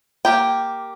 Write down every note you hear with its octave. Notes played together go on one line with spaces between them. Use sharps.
A#3 G4 G5